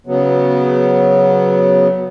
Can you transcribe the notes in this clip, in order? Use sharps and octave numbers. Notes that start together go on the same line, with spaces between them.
C#3 F#3 B3